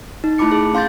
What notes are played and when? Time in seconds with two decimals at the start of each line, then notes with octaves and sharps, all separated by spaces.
0.24 D#4
0.38 A3 E4 A5 B5 D6 C#7
0.52 G#4
0.74 C#4 F5 C6 G6 A6